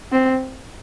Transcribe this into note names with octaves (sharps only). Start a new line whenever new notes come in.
C4